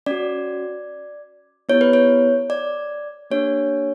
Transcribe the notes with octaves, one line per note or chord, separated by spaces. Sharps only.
C#4 F#4 D5
B3 E4 G4 C#5
B4
C#5
D5
A#3 D4 G4 C#5